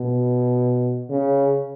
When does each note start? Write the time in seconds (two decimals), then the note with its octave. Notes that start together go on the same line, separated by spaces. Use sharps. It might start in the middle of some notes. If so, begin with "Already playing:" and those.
Already playing: B2
1.10 C#3